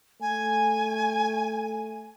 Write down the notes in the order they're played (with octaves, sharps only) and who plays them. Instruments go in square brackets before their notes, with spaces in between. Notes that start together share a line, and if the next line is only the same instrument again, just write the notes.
[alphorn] A3 [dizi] G#5